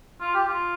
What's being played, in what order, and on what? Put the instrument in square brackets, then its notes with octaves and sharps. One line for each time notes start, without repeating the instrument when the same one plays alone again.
[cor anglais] F4
G4
F4